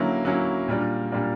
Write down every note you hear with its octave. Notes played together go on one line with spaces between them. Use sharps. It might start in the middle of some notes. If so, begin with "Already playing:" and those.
Already playing: D3 F#3 A#3 C#4 E4
D3 F#3 A#3 C#4 E4
A#2 G3 A#3 D4
A#2 G3 A#3 D4